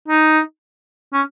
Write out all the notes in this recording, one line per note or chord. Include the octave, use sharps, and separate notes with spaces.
D#4
C#4